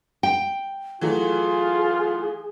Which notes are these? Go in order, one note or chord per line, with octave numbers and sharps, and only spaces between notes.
G5
E3 F#3 A3 F4 G#4